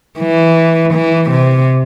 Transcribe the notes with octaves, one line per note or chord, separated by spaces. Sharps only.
E3
E3
C3